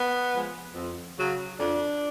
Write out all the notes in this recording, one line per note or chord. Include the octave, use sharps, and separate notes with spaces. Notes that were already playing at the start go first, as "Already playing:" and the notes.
Already playing: B3
F3 G#3
F2
C#3 F#3
F2 D4